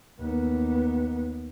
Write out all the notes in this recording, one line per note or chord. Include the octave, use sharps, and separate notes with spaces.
D#2 B3